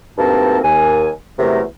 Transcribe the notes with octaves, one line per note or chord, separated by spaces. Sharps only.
D2 G2 A#3 C4 D#4 A5
D#2 G#5
E2 C3 F#3 A3 A#4